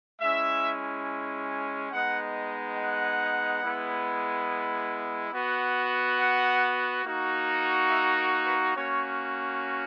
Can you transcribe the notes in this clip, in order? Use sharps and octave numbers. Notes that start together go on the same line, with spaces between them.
G#3 C#4 E4 E5
G#3 B3 D#4 F#5
F#5
G#3 B3 E4
B3 F#4
F#5
A#3 D#4 F#4
E5
A#4
B4
A#3 C#4 F#4 C#5